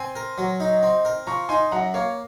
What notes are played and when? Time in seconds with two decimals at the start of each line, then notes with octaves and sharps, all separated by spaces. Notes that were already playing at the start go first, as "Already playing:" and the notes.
Already playing: C4 G#5 C6
0.15 A#4
0.38 F#3
0.60 D#4
0.83 C4
1.05 A#4
1.27 F3 A#5 C#6
1.49 D#4 G#5 C6
1.72 F#2 F#5 A#5
1.94 A#3 C#5 F5